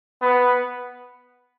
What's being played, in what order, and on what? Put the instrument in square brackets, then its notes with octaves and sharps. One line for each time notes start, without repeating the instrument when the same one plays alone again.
[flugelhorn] B3